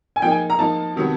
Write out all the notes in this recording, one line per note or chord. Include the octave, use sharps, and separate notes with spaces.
G#5
F3 A#3 D#4 G5
G#5
A#5
F3 A#3 D#4 A5
C3 D#3 F#3 B3